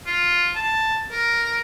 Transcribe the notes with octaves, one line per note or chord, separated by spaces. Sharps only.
F4
A5
A#4